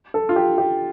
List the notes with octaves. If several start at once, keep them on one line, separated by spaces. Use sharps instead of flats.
A4
F4
G4
G4